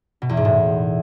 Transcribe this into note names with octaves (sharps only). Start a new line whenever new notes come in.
B2
E2
G#2
A2